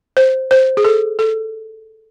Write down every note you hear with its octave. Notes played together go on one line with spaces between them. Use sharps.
C5
C5
G#4
A4
A4